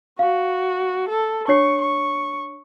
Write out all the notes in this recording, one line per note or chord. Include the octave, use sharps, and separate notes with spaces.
F#4 F5
A4
D4 C#5 C#6 C7
C#6